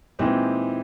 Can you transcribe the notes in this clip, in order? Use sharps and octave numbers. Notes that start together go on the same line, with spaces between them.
A#2 E3 G#3 C4 D#4 G4